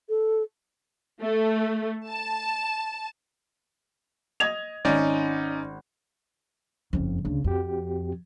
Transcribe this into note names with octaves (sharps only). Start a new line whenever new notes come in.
A4
A3
A5
D#5 G#6 F7
G#1 C#4 D#4 D5
F#1 F2 C#3
D2 C#3
F2 C4 F#4 G4